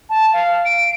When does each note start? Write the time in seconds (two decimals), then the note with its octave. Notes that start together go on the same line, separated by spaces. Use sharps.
0.10 A5
0.33 F5
0.65 D7